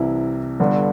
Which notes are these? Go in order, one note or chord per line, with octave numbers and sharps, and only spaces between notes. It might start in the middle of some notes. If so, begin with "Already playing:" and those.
Already playing: C2 C3 E3 E4
G1 G2 D3